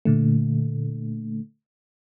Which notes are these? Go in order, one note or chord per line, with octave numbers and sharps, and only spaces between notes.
A#2 D3 A3